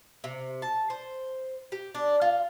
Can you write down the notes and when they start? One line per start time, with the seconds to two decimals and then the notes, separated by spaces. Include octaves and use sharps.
0.24 C3
0.62 A5
0.90 C5
1.72 G4
1.94 D4
2.21 F4